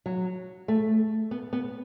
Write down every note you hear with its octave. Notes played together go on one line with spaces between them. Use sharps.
F#3
A3
B3
B3